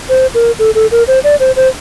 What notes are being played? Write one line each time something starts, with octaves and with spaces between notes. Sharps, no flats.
C5
A#4
A4
A4
A#4
C5
D5
C5
C5